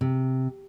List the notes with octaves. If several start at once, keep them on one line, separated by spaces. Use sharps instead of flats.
C3